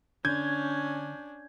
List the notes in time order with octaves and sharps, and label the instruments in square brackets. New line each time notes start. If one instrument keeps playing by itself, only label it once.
[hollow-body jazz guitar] D3 [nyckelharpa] C#4 D4 [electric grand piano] G6 G#6